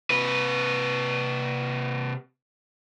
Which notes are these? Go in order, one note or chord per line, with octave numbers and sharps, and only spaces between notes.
C3 B4